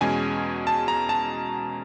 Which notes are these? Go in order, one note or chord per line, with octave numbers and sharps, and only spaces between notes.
E2 B2 G#3 C#4 G#5
A5
A#5
A5